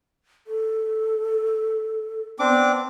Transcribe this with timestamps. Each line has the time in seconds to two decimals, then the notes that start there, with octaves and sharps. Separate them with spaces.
0.47 A4
2.39 B3 C4 D4 D6